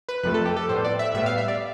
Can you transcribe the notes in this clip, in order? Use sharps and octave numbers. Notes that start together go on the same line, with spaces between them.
B4
F2 C3 F3 A3 B4
A4
G4
A4
A2 G3 B3 C5
D5
E5
A2 G3 B3 E5
F5
E5
D5